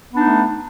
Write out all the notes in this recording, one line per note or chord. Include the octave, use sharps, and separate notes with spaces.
A3 B3 D4 D#4